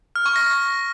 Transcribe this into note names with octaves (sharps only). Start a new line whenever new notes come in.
F6
C#6
A#6